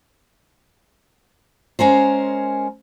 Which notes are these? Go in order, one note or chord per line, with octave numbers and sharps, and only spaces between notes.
G#3 C#4 A#4 C5